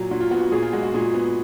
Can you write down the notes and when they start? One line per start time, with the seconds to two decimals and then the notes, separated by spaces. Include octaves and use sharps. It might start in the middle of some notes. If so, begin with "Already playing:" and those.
Already playing: A#2 F#3
0.11 A#2 F#4
0.21 F4
0.31 B3 F#4
0.41 F#4
0.52 A#2 G#4
0.62 F4
0.73 G#3 F#4
0.83 F#4
0.94 A#2 G#4
1.14 B3